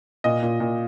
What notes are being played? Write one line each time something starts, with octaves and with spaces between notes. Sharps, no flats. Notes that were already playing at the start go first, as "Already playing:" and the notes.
A#2 D#5
A#2
A#2